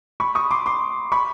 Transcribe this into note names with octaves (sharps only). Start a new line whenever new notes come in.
B5 C#6
C#6 D#6
C6 D6
C6 D6
B5 C#6